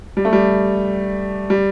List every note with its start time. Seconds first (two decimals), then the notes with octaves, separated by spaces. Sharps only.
0.17 G3
0.25 A3
0.33 G3
1.50 G3